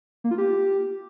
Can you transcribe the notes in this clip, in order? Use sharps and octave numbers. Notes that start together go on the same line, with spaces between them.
A#3
F4
G4